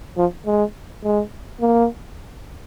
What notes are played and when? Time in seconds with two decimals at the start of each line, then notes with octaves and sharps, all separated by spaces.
0.17 F3
0.46 G#3
1.04 G#3
1.61 A#3